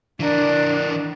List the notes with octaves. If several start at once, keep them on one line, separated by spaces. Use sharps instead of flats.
E3 D4 A#4